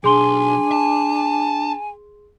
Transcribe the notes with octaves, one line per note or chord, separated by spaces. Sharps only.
B1 D4 G#4 G#5 C6 G7
A5